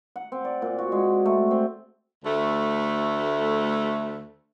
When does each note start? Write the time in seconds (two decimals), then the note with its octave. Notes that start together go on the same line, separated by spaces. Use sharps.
0.16 F#5
0.32 C4
0.45 D5
0.62 A#2
0.78 F#4
0.92 G#3
1.26 A3
1.51 C4
2.25 D2 A3